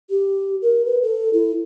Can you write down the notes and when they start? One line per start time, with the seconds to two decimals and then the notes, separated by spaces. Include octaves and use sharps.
0.10 G4
0.62 A#4
0.86 B4
1.03 A4
1.33 E4